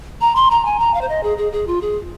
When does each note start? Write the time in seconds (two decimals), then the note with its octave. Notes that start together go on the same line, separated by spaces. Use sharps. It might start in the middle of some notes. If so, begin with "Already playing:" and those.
0.21 A#5
0.36 C6
0.51 A#5
0.65 G#5
0.79 A#5
0.94 F5
1.01 C5
1.09 D#5
1.23 G#4
1.38 G#4
1.52 G#4
1.67 F4
1.81 G#4